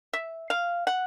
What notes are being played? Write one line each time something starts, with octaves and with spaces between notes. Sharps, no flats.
E5
F5
F#5